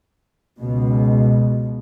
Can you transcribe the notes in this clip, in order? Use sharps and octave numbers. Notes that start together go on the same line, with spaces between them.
C#2 B2